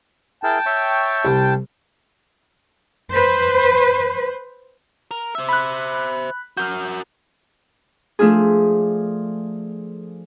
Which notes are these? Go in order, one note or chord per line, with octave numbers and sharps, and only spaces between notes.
E4 G#4 A#4 G5 A5
C#5 E5 C#6
C2
B4 C5
A#4
C5 E5
B5 F#6
F#4 A#4 F6 G6
F3 A3 D4 F4 G#4